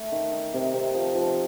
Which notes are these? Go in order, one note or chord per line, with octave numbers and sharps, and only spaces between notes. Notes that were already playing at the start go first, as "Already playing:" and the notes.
Already playing: A3 A4
D#3
D#4
C3
C3
F3
F3